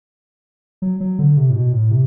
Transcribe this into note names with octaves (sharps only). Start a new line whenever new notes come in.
F#3
F#3
D3
C3
A2
B2
A2
C3